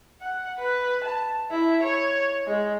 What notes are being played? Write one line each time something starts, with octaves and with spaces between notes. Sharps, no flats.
F#5
B4
A5
E4
C#5
G#3